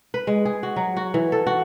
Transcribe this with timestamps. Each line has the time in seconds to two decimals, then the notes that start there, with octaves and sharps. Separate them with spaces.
0.14 B4
0.27 G#3
0.45 G#4
0.63 F#4
0.76 F#3
0.97 F#4
1.14 E3
1.32 A4
1.47 F#4